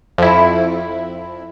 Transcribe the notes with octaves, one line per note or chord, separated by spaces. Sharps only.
F2 E4